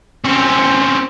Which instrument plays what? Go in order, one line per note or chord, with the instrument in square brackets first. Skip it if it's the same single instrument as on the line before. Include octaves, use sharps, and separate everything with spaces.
[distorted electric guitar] C4 C#4